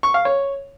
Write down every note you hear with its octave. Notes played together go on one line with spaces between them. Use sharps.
C#6
F5
C#5